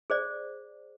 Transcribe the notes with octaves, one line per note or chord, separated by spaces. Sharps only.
G#4 C5 D5